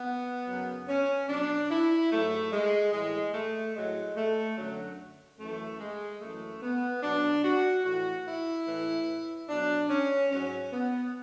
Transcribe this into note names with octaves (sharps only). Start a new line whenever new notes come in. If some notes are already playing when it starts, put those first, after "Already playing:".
Already playing: B3
F#2 C#3 F#3
C#4
B2 F#3 D4
E4
G#2 F#3 A3
G#3
A2 E3 G#3
A3
A2 F#3 G#3
A3
F#2 D3 F#3
F#2 E3 A3
G#3
F#2 E3 A3
B3
B2 F#3 D4
F#4
A2 E3 F#4
E4
A2 E3
B2 F#3 D4
C#4
G#2 F#3 C#4
B3